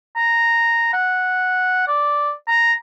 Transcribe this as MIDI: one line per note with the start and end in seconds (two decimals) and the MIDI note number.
0.16 0.90 82
0.93 1.85 78
1.88 2.31 74
2.48 2.73 82